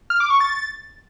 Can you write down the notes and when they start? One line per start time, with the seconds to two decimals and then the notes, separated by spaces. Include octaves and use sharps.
0.10 F6
0.20 D6
0.30 C#6
0.41 A6